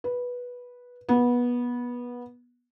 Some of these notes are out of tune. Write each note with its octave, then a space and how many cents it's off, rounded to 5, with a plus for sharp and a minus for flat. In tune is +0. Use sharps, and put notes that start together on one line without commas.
B4 -10
B3 -20